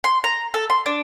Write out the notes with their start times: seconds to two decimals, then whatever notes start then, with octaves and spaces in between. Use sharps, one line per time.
0.04 C6
0.24 A#5
0.54 A4
0.70 C6
0.86 D4